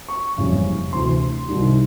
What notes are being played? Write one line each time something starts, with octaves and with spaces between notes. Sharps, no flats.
C#6
F#1 F2 C#3 E3 G3
D2 C3 E3 C6
C2 C3 D#3 G3